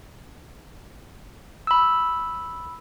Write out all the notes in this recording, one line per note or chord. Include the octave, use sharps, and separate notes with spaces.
B5 E6